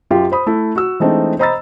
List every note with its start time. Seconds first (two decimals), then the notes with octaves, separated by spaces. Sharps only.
0.10 F#2 F4 G4
0.32 C5 B5 D#6
0.47 A3 E4
0.75 F#4 E6
1.00 E3 G#3 A3 C4 D4 D#4
1.39 C5 D#5 A#5 B5 E6 A6